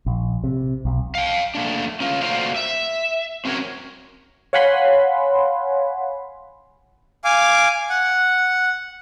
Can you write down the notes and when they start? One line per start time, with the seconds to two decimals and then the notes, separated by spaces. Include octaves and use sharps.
0.06 A#1
0.44 C3
0.85 B1
1.15 F5 G5
1.55 A3 A#3 D4
2.00 C#4 F4
2.22 A3 A#3 F#4 C5 D5 F5
2.56 E5
3.45 C4 C#4 F#4 A#4 C#5
4.53 C#5 F5 F#5 G#5 B5 C6
7.24 F5 G#5 D6
7.90 F#5